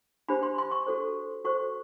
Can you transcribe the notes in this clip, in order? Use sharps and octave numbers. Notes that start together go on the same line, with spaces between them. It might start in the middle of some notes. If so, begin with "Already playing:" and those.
D4 G4 C5 B5
C6
C6
C#6
F#4 A4 C5
F#4 A4 C5 C#6